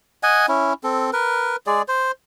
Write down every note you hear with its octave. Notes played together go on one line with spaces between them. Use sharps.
D#5 F#5 G#5
C#4 E4
C4 A4
A#4 B4
G#3 G#4 D5
C5